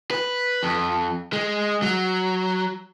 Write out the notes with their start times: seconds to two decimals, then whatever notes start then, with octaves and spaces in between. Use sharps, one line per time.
0.11 B4
0.63 F2
1.33 G#3
1.83 F#3